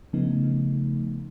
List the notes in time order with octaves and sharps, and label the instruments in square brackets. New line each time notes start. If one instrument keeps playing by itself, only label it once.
[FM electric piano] C#3 F3 A3 B3 D#4